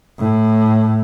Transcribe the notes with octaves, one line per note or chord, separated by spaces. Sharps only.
A2